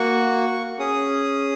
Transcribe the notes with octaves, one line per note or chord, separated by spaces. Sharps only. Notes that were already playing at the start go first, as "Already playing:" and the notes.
Already playing: A#3 F#4 C#6
C#4 G#4 D#6